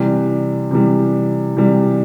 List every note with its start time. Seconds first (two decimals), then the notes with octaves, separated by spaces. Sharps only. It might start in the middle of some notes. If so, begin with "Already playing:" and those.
Already playing: C3 E3 G3
0.71 C3 E3 G3
1.57 C3 E3 G3